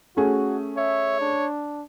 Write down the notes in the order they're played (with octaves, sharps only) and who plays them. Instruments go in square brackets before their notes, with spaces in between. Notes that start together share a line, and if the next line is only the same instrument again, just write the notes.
[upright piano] A3 C#4 G#4 [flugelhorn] F#4
[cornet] C#5 [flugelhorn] E5
[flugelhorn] D4